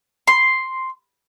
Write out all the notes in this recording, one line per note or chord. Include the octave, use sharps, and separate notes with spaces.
C6